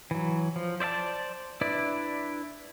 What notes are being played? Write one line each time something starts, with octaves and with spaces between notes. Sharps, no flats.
E3 F#3
F3
C5 D5 E5 A5
D4 E4 B4 D5